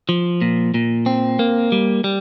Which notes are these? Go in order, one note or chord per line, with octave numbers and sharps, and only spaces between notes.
F3
A#2
A#2
C4
A#3
G3
G3